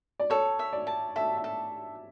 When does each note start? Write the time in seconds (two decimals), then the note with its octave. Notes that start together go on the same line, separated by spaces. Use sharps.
0.20 D5
0.30 A4 C#5
0.59 E5
0.73 D5
0.87 A5
1.16 A4 E5
1.37 E5
1.44 A4